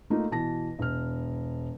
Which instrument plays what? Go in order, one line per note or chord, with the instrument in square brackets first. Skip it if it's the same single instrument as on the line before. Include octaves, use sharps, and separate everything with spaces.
[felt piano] A3 A#3 D#4 F4
B2 E3 A5 A#6
E1 F6